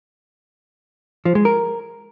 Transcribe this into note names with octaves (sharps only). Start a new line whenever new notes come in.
F3
G#3
A#4